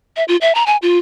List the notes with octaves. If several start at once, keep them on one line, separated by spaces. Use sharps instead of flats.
E5
F4
E5
A#5
G#5
F4